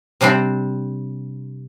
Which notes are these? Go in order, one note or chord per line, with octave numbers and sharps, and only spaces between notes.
C3 G3 C4 D4